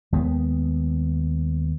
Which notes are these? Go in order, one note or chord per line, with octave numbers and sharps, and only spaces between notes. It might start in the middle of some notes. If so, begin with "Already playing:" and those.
D#2 G#3 B3